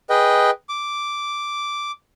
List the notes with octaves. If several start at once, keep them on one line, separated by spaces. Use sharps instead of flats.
G#4 B4 D#5 G5
D6